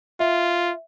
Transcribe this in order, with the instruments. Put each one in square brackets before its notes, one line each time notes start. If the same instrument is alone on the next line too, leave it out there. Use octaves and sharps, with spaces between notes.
[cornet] F4 [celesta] E5